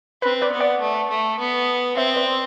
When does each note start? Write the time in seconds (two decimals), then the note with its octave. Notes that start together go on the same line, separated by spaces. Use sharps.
0.22 C4 B4
0.42 B4 D5
0.52 B3
0.60 D5 F#5
0.80 A3
1.10 A3
1.39 B3
1.97 C4 C5 E5
2.16 B4 D5